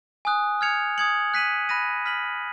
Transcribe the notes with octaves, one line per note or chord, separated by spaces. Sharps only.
G#5 D#6 F#6
F6 G#6 C#7 F7
D#6 G#6 C#7 F#7
F#6 B6 D#7 F#7
B5 F#6 A#6 D#7
F6 B6 F#7